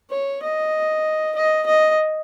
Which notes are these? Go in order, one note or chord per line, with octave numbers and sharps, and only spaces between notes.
C#5
D#5
D#5
D#5